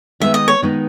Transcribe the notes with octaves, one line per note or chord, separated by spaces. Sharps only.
D#3 G#3 B3 D#4 E5
D#5
C#5
D#3 G#3 B3 D#4